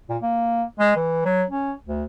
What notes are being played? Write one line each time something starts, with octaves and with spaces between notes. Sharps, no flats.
A#2
A#3
G#3
E3
F#3
C#4
D2